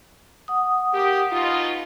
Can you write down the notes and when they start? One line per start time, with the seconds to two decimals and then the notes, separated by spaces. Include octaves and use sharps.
0.48 F#5 D#6
0.94 A#3 G4
1.32 B2 D#4 F4